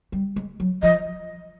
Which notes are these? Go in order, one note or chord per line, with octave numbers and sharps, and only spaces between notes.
G3
G#3
F#3
F3 D#5